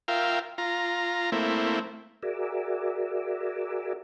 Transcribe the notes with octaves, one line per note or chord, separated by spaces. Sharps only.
F4 A#4 E5 F5 G5
F4 A#5
A3 A#3 C4 E4
F#4 G#4 A#4 D5 E5